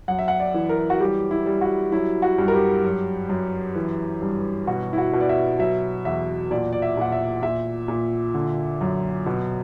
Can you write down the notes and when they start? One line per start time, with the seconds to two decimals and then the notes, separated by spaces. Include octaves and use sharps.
0.08 F#2 F#5
0.19 E5
0.28 F#5
0.40 D5
0.54 E3
0.69 A#4
0.90 F#4
1.00 G3 G4
1.31 E4
1.46 G3
1.61 F#4
1.92 F#3 E4
2.22 F#4
2.38 G2
2.48 A#4
2.54 G4
2.85 F#2
3.29 F#2
3.75 E3
4.22 G2
4.67 B2 F#4
4.93 E4
4.98 F#4
5.13 B2
5.20 D5
5.29 E5
5.59 F#3 E5
6.05 E2 E5
6.51 A#2 D5
6.72 D5
6.82 E5
6.97 A#2 F#5
7.12 E5
7.43 A#2 E5
7.88 A#2
8.34 D3
8.81 F#2
9.26 B2